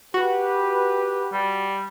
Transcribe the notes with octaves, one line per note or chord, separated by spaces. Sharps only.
F#4 G4 B4
G3